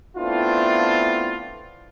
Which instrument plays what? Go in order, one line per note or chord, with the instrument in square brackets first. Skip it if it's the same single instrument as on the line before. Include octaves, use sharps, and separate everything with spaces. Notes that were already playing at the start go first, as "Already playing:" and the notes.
[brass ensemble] A3 B3 C4 D4 E4 F4